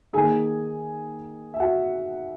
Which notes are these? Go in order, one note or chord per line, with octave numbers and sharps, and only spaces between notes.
D#3 A#3 D#4 G#4 G#5
E5
F#4 F#5